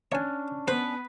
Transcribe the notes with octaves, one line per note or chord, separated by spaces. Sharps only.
C#4 D4 C#5 G#5
B3 B4 C5